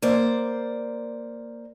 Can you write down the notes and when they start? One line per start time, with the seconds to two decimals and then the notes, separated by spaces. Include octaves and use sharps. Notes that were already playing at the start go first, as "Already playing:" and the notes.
0.02 A#3 C5 D5